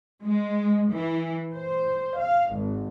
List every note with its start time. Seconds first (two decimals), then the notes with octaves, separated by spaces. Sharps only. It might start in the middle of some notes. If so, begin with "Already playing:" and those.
0.22 G#3
0.90 E3
1.53 C5
2.22 F5
2.52 G#1